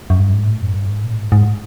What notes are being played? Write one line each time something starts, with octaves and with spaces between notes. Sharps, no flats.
F#2
G2
G#2
A2
F#2
G2
G#2
A#2
A2
G#2
G#2